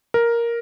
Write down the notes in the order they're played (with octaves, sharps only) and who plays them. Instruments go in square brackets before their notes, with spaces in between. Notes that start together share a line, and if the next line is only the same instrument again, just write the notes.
[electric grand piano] A#4